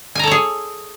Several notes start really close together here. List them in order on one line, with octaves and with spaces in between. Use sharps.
G#5 A#5 A4 C#5 G#4